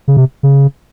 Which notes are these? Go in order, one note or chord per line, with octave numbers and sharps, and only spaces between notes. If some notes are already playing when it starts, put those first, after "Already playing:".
C#3
C3
C#3